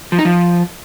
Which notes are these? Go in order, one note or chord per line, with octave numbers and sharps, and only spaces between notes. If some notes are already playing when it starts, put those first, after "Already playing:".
F3
D#4
F3